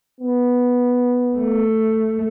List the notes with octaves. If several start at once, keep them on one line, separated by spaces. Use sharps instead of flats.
B3
A3